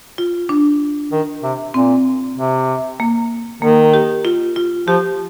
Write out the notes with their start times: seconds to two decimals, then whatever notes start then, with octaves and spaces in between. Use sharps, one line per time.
0.18 F4
0.49 D4
1.12 D#3
1.43 C3
1.74 A#2 C4
2.37 C3
3.00 A#3
3.62 D#3 A#3
3.94 G4
4.25 F4
4.56 F4
4.88 F3 G4